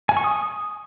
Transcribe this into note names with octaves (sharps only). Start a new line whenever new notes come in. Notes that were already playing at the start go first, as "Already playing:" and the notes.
G#5
C#6
D#6